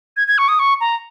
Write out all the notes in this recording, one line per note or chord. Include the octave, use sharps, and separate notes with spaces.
G#6
G#6
C#6
D#6
C#6
A#5